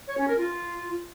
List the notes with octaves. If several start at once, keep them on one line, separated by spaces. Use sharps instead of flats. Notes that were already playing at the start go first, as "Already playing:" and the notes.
C#5
C#4
A#4
F4